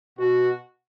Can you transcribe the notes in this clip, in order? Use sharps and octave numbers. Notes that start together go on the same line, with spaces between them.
B2 F#4